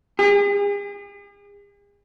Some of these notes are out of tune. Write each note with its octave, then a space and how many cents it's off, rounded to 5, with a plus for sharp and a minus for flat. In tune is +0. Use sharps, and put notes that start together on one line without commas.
G#4 -45